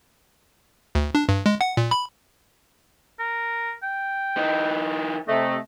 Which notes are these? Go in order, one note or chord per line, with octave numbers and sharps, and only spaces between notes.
D2
D4
G2
G#3
F#5
A#2
B5
A#4
G5
E3 D#4
C3 A3 D#5